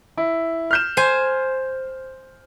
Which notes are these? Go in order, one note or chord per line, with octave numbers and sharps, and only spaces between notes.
E4
F6 G6 E7
C5 G#5